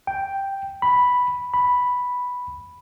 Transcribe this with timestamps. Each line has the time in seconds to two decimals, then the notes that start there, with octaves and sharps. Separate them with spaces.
0.07 G5
0.82 B5
1.54 B5